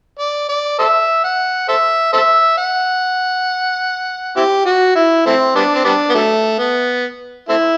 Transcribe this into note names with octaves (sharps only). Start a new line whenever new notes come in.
D5
D5
A4 C5 E5
F#5
A4 C5 E5
A4 C5 E5
F#5
C4 E4 G4
F#4
E4
E3 A3 C4
G3 B3 D4
C4
G3 B3 D4
B3
D3 F#3 A3
B3
A3 C4 E4